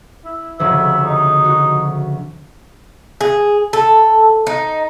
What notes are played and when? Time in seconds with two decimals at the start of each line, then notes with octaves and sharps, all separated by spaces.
0.25 E4
0.59 F1 D2 C#3 E5
1.05 D#4
1.44 F#4
3.21 G#4
3.73 A4
4.47 D#4